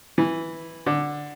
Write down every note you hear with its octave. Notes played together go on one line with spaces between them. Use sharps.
E3
D3